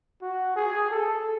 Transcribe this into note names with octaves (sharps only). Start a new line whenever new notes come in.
F#4
G#4
A4